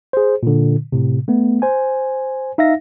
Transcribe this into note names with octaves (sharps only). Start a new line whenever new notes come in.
G#4 C5
A#2 D3
A2 C3
A3 B3
C5 G#5
D#4 E5 F5 A#6